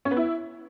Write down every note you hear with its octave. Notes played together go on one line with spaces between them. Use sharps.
C#4
B3
E4